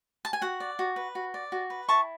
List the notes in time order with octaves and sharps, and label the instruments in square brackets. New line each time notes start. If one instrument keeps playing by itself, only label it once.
[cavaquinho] A5
G#5
F#4 F#5
D5
F#4
B4
F#4
D5
F#4
B4
E4 A5 C#6